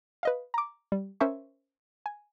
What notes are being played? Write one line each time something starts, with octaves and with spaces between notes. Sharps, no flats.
B4 D#5 F5
A#5 D6
G3
C#4 A#4 C5 E5 G#5 C#6
G#5